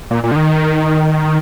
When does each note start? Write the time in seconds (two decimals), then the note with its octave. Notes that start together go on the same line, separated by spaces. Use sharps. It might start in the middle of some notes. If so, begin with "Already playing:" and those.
0.11 A#2
0.24 A#2
0.32 D3
0.36 D#3